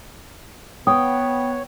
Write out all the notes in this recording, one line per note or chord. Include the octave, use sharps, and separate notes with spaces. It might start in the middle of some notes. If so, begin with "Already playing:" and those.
B3 C#5 G5 C#6 D#6